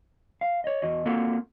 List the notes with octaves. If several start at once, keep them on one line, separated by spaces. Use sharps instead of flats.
F5
C#5 D#5
E2 F#4 D#5
A#3 C4 F4 F#4 A4 A#4